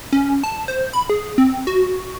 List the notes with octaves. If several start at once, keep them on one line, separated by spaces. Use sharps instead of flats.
C#4
A5
C5
B5
G#4
C4
F#4